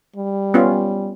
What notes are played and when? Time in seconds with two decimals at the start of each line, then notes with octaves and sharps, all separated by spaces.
0.16 G3
0.54 B3 C#4 F4